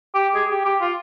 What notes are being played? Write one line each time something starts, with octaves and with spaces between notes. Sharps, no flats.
G4
G#4
G4
G4
F4